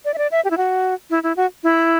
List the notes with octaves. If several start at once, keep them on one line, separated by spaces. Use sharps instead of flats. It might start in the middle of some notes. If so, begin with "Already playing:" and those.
D5
E5
D5
E5
G4
E4
F#4
E4
E4
F#4
E4